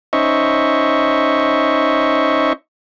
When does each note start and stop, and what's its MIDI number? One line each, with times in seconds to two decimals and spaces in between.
0.13 2.53 61
0.13 2.53 63
0.13 2.53 72
0.13 2.53 75
0.13 2.53 76
0.13 2.53 85